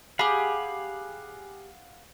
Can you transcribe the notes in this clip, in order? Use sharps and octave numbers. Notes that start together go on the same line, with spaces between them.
G4 G#4 F5 F#5 B5